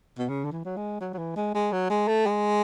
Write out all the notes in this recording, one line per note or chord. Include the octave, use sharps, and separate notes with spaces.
B2
C#3
D3
E3
F#3
G#3
F#3
F#3
E3
G#3
G#3
F#3
G#3
A3
G#3